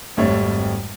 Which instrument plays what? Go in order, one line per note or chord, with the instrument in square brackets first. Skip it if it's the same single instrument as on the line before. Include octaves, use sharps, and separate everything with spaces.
[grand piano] G#1 F2 G3 A3 C#5